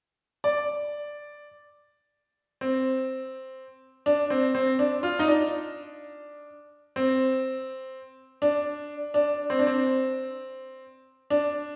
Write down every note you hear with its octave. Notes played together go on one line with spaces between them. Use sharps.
D5
C4
D4
C4
C4
D4
F4
D#4
D4
C4
D4
D4
C4
D4
C4
D4